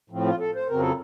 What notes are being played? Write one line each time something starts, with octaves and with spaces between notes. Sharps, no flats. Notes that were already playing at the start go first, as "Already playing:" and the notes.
A2 F3 C4
F4
A4
C5
F2 C#3 F#3 C4 A#4
A4